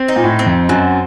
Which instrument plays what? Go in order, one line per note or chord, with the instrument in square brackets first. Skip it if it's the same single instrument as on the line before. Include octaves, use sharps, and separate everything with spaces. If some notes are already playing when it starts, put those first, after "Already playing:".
Already playing: [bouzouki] C4
D#4
[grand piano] A#2
A2
[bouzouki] C4
[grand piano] F2
[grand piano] F#2 [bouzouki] F#3